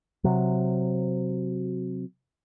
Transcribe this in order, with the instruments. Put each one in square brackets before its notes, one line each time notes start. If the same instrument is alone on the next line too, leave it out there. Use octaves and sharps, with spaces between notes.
[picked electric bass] C3 F#3